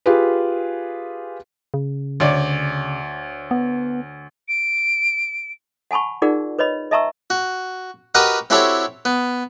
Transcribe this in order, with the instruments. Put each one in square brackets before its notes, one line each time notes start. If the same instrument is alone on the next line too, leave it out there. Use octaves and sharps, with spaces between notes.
[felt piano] F4 G4 G#4 B4
[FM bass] C#3
[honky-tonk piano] D2 C#5 D5
[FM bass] B3
[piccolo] D7
[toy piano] F#5 G#5 A5 B5 C#6
D#4 F4 G#4 A#4 D5 F#5
B4 C#5 D#5 B5
D#5 E5 A5 A#5 C#6 E6
[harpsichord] F#4
F#4 G4 A#4 B4 D#5 F#5
C4 E4 F#4 G4 A4 C#5
B3